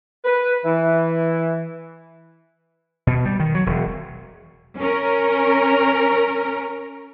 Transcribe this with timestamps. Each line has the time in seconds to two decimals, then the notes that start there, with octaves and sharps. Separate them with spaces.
0.25 B4
0.65 E3
3.07 B2
3.25 G3
3.40 D#3
3.55 F#3
3.66 E1
4.78 C#4 A#4